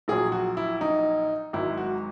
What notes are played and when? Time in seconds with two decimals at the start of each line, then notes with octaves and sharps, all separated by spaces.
0.08 A#1 A#2 F#3 G#4
0.32 F#4
0.57 E4
0.81 D#4
1.53 G#1 G#2 F#3 E4
1.77 F#4